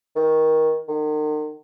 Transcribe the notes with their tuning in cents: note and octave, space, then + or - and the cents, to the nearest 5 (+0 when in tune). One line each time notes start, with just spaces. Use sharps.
D#3 +20
D#3 -40